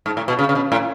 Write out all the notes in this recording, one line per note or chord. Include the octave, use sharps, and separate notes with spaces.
G#2
A2
B2
C#3
C#3
B2
A2